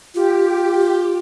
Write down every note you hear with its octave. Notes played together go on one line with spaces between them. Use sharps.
F4 G4